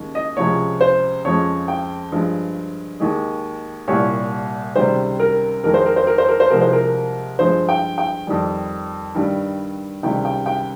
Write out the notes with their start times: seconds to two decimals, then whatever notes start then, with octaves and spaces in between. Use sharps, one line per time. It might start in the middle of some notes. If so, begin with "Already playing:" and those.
Already playing: D#2 C#3 G#3
0.15 D#5
0.37 C#2 C3 F3 G#3 C#5
0.81 C5
1.24 F2 C#3 F3 G#3 C#5
1.68 G5
2.12 G2 F3 G#3
3.00 D#2 D#3 G#3
3.88 C2 A#2 G3 C#5
4.76 C#2 C3 D#3 G3 C5
5.20 A#4
5.63 F2 D#3 G#3 A#4
5.74 C5
5.86 A#4
5.96 C5
6.07 A#4
6.18 C5
6.29 A#4
6.40 C5
6.50 C2 C3 F3 G#3 A#4
6.61 C5
6.73 A#4
7.39 G2 F3 G#3 C5
7.69 G5
7.98 G5
8.27 F2 D#3 G3
9.15 G2 D#3 G3
10.03 C#2 C3 D#3 G3 G5
10.25 G5
10.46 G5